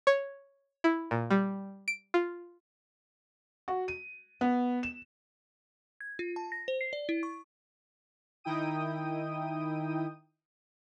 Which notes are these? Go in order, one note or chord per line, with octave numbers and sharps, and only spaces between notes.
C#5
E4
A#2
G3
D7
F4
F#4
D#7
B3
E7
G#6
F4
A5
A#6
C5
C7
D5
E4
C#6
D#3 D#4 E4 G5 D#6 D#7